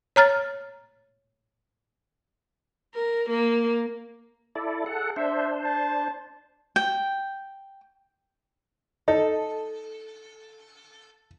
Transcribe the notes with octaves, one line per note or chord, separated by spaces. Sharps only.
C#5 A#5 F6 A6
A#4
A#3
E4 A4 D5
G#4 A4 F#5
D4 C5 E5
A5
G5
D#4 A4